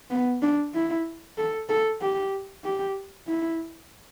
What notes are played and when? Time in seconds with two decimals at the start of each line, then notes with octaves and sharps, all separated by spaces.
0.10 B3
0.42 D4
0.74 E4
1.38 A4
1.69 A4
2.01 G4
2.64 G4
3.28 E4